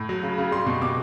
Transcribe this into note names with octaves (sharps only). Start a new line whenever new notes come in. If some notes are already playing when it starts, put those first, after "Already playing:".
Already playing: A2
F#3
C#3
C#3
G3 C6
B2 C#6
B2 D6